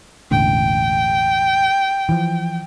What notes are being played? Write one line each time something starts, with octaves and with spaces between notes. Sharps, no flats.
E1 A1 D3 G5
E3 F3